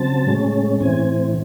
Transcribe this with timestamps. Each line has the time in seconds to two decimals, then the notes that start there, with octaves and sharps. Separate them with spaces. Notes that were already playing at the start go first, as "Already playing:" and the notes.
Already playing: C#3 F#3 C4 A5
0.27 A2 G#3 C#4
0.80 A2 E3 C4 G#5